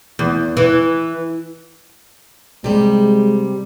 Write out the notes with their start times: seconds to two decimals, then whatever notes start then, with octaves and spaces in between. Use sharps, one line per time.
0.19 E2
0.57 E3
2.64 C3 G3 G#3 G4